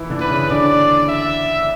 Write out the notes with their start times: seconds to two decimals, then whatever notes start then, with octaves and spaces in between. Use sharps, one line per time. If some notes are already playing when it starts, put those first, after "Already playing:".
Already playing: E3 E4
0.10 D3 D4
0.20 B4
0.30 C#3 C#4
0.49 D3 D4 D5
1.08 E5